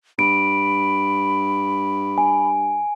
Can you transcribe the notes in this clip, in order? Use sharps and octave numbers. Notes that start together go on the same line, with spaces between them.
G2 B5 D7
G#5